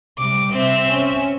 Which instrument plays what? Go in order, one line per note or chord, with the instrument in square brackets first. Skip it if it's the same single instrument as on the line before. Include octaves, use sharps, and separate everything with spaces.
[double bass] C3 G3 [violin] D6
[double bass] C3 [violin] C4 E5
[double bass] C#4